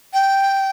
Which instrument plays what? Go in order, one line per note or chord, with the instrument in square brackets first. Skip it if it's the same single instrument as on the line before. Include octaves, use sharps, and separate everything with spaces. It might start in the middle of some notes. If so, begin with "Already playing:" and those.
[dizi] G5